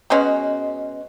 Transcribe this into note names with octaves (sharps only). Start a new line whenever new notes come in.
B2 G#3 C#4 F#4